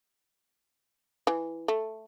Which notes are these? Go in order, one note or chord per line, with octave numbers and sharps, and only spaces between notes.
E3
A3